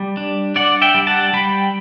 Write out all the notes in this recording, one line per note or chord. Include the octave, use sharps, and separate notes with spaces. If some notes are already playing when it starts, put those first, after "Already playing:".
Already playing: G3
D4
D4 D5 F#5
E5 G5
G3
F#5 A5
G3 G5 B5